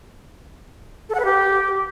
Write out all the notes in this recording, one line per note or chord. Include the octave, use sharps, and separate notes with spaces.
A4
F#5
B4
G4